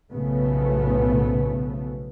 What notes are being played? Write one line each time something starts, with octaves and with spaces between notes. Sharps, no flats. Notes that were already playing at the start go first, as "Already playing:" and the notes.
B1 A2 C#3 F3 A3 B3